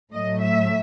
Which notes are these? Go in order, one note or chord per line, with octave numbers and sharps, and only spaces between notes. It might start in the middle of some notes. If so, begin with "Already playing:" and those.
A2 F#3 A3 D#5
E5